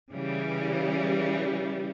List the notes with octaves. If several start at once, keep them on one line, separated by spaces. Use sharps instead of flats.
C#3 E3 G3